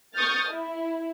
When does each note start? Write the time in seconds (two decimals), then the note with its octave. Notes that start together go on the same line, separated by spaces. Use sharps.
0.14 C#6 D#6 F6 G6 A6
0.51 E4